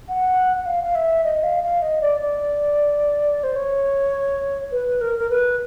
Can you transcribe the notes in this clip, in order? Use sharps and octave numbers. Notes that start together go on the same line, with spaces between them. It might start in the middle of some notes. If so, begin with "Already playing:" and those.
F#5
F#5
F5
F5
E5
D#5
F5
F5
D#5
D5
D5
C5
C#5
B4
A#4
A#4
B4